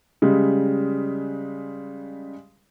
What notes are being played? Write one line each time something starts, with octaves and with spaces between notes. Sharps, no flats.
C#3 G3 G#3